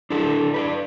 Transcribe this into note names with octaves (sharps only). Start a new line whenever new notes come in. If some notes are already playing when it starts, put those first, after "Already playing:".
D4 E4 A4
B4 C#5 D5